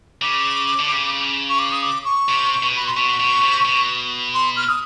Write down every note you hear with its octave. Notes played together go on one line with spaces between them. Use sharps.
C#3 D6
D3
C#3
C#6
D6
D#6
D6
C#6
C3
B2
B5
C6
B2 C#6
B2
C3
B2
C6
F6
D#6